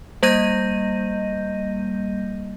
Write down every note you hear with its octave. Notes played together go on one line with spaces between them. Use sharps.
G3 A#3 D#5 G6 A#6 D#7